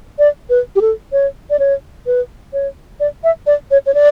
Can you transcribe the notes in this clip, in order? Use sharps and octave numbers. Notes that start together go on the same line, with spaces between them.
D5
B4
G4
A4
C#5
D5
C#5
B4
C#5
D5
E5
D5
C#5
C#5
D5